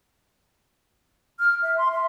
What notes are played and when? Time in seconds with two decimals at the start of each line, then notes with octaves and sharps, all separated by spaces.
1.39 F6
1.62 E5
1.78 C6
1.92 E5